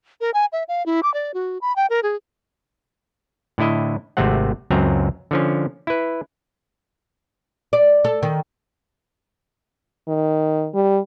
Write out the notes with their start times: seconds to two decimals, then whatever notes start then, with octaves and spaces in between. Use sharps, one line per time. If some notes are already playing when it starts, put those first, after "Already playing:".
0.21 A#4
0.34 G#5
0.53 E5
0.68 F5
0.86 E4
1.03 D6
1.14 D5
1.34 F#4
1.61 B5
1.76 G5
1.90 A#4
2.03 G#4
3.58 A2 D3 E4 D#5
4.17 G#1 C3 A3 C4 F#5
4.70 C#2 F#2 F#3 C4 A#5
5.31 D3 F3 C#4
5.87 E4 B4
7.73 D5
8.05 A4
8.23 D#3
10.08 D#3
10.74 G3